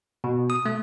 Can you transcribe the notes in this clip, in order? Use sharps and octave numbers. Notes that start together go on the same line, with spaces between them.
B2
D#6
A3